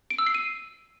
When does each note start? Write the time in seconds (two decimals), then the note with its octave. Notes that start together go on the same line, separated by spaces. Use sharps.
0.10 D7
0.18 E6
0.26 C7
0.35 D#7